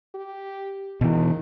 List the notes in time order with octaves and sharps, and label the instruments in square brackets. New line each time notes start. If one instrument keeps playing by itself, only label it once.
[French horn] G4
[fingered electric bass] B2 E3 [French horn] D#3